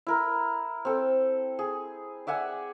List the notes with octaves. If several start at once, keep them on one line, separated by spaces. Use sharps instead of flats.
E4 A#4
C4 A4
G#4
D5 E5 F#5 G#5